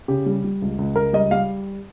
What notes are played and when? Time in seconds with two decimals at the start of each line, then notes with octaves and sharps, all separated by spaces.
0.08 C#3 G4
0.26 G3
0.44 G3
0.62 C#2
0.78 C#2
0.96 C#2 A#4
1.13 G3 D#5
1.31 G3 F5